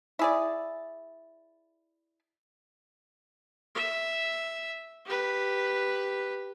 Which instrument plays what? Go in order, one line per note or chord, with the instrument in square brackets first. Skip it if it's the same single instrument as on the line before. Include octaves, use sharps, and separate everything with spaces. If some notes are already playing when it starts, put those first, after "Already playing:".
[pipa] E4 G#4 D5
[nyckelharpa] E5
G4 B4